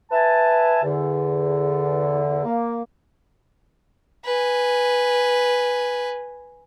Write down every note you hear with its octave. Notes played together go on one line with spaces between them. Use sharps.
B4 E5 G#5 A5
E2 D3
A#3
B4 G#5